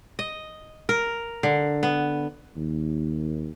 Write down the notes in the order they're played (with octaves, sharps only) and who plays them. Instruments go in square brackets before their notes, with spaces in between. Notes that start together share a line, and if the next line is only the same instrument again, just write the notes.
[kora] D#5
A#4
D3
B3
[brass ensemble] D#2